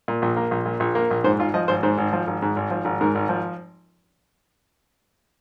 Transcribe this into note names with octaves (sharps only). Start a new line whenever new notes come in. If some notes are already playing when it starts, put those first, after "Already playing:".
A#2
A#1
A#3
A#1
A#2
A#1
A#3
A#1
G#2 C5
G#1 F4
F3 D#5
G#1 C5
G#2 C5
G#1
F3
G#1
G#2
G#1
F3
G#1
G#2 A#4
G#1
F3